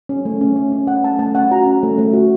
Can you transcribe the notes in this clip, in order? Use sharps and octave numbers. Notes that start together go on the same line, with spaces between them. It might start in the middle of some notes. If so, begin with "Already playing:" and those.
C#4
A3
C#4
C#4
C#4
C#4 F#5
A3 A5
A3 A5
C#4 F#5
F#4 A#5
C#4
A3
A3
F#4